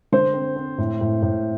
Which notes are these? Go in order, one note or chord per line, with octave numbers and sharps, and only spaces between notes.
D3 C5
C4
C4
A2
A2
A2